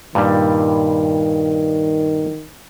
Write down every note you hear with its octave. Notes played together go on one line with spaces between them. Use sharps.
G2 A#2 D#3 G3